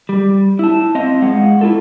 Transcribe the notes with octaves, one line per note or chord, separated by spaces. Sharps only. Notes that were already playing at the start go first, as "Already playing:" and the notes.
G3
E4 A5
C4 D#5 F5
G#3 G#4 F5 F#5
E4 F4 A4